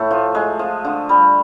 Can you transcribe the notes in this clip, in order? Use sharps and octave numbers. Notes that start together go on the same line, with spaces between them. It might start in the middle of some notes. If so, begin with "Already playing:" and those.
Already playing: A2 A3
F3
G#3
F3
D3
G3